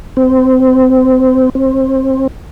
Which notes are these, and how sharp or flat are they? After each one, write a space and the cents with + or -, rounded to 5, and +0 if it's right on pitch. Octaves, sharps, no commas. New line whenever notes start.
C4 -20
C4 +25